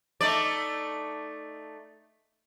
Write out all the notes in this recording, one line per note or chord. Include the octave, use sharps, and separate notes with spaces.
A3 D#4 D5